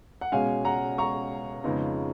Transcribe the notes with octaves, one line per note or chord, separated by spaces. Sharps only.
F#5
B2 G#3 C#4 F5 G#5
F#5 A#5
A#5 C#6
F2 C#3 G#3 B3 D#4